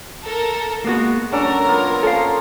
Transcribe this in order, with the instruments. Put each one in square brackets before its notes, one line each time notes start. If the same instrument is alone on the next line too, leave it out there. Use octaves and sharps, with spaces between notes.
[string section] A4 A#4
[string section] G#3 [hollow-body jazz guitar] A#3 B3 F#4
[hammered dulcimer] F#3 A4 [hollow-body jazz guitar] C#4 D4 [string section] A#4
[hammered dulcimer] A#3 B3 F4
[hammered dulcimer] F3 C#4 A#5 [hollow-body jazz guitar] A4 F5